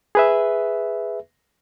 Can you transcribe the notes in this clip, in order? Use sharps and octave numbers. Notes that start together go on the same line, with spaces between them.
G#4 B4 E5